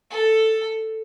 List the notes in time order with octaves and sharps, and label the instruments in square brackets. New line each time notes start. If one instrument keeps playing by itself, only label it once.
[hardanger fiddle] A4